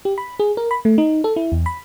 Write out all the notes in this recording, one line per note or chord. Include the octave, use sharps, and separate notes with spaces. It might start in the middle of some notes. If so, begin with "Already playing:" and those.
G4
B5
G#4
A#4
B5
A3
D#4
A4
E4
E2
B5